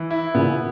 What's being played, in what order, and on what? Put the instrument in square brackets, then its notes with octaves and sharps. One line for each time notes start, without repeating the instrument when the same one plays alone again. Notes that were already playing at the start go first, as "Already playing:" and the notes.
Already playing: [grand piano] E3
E4
[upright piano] A#2 C#3 [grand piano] B3